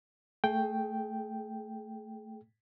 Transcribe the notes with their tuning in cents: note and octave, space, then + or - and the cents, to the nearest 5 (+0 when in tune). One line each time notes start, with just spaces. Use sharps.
A3 +10 G#4 +30 G5 +0